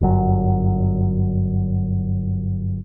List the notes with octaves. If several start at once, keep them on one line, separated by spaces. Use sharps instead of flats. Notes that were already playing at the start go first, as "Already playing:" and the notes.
G1 F#2 F#3